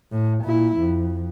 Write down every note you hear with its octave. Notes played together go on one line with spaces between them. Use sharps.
A2
A#2 E4
F2